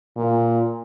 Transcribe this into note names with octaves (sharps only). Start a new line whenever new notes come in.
A#2